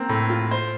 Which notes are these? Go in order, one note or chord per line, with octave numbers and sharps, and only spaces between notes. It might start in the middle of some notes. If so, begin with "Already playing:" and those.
Already playing: A#3 C4
A2
F4
C5